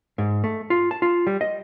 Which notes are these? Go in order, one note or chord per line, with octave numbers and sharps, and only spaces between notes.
G#2
A3
F4
A5
F4
G3
D#5